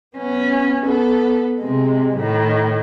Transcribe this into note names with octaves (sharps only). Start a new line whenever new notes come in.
B3 C#4
B3 A4
C3 G#3
A2 D#3